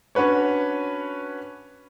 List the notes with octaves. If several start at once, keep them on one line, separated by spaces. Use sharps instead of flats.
C#4 D4 F#4 B4 C#5